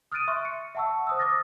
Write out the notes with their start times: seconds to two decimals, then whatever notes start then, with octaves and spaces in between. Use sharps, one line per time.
0.12 D#6 F6 F#6 A6 D7 D#7
0.28 E5 C6 C#6
0.45 C#7
0.75 E5 F#5 A5 C#6 E6
1.07 C5 D#6 E6
1.19 D6 D#6 F6 A6 A#6